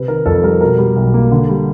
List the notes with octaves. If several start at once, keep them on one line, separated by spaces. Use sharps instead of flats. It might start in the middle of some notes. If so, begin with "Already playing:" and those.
Already playing: C3 B4
D#3 A#4
F2 A4
G3 A#4
B2 A#4
G3
B1
A#3
D3
G3